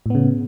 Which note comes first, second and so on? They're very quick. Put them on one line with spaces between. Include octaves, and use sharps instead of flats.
A2 B3 C#3